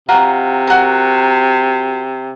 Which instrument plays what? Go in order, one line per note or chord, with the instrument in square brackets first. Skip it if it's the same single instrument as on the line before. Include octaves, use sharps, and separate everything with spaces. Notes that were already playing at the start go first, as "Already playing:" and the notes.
[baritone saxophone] C3 [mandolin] F4 F#4 A#5
[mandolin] F#4 A#4